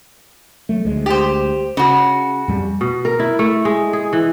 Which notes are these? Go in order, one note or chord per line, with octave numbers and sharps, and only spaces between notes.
F#3 A3
D2 G#3
G4 C5
C#3 C#4 F#4
F2 G3
B2
A#4
E4
A3
G#3
G#4
E3